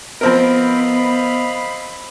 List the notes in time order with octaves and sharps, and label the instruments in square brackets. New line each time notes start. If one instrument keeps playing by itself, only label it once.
[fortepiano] F3 C4 A#4 [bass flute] B3 [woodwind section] D#5 F5 B5